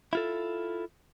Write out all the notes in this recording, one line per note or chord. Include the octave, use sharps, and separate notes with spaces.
E4 F4 A4